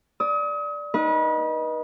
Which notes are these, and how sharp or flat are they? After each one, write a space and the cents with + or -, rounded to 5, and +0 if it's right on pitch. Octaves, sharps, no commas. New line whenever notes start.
D5 +0 D#6 +40
D#4 +0 B4 -35 D#5 +0